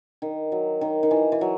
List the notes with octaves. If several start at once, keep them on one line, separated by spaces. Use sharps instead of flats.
D#3
F#3
D#3
D#3
E3
E3
F#3